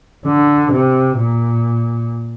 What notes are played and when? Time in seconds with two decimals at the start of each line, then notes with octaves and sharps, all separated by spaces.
0.26 D3
0.72 C3
1.18 A#2